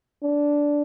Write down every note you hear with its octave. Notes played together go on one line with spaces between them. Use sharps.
D4